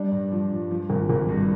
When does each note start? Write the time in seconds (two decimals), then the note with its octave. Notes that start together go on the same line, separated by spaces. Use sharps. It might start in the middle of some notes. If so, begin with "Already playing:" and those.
Already playing: G3 D4
0.12 G2
0.32 F3
0.51 G2
0.71 F3
0.90 G#1
1.09 G#1
1.29 G2